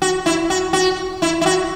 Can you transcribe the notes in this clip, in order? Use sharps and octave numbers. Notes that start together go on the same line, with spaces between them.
F#4
E4
F#4
F#4
E4
E4
F#4